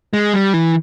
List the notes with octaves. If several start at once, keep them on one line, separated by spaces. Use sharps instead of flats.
G#3
G3
E3